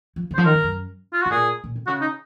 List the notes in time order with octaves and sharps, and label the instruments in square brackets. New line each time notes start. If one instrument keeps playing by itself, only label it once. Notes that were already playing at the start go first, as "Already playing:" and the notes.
[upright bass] F3
C#3
[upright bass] F3 [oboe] C5
[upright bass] D#3 [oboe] A#4
[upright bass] G#2
F#2
[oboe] F4
F#4
[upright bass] G#2
[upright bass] A#2 [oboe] G#4
[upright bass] A#2
C3
[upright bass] C#3 [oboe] F#4
[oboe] D#4